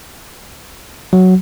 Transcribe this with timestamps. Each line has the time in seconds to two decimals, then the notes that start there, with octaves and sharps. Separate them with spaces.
1.13 F#3